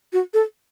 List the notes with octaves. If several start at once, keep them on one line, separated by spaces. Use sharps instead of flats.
F#4
A4